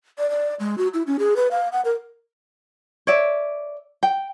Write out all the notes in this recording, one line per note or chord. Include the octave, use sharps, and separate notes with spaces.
D5
D5
G#3
F#4
E4
C#4
G#4
B4
F5
F#5
A#4
C#5 D5 E5
G5